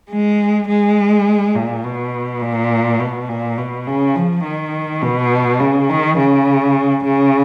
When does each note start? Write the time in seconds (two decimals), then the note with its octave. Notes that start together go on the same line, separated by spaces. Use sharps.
0.11 G#3
0.69 G#3
1.55 A#2
1.84 B2
2.42 A#2
3.00 B2
3.29 A#2
3.58 B2
3.87 C#3
4.15 F3
4.44 D#3
5.02 B2
5.60 C#3
5.89 D#3
6.18 C#3
7.04 C#3